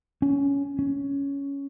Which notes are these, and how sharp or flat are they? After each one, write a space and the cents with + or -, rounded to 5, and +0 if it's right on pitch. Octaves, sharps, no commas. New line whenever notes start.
C#4 +15
C#4 +10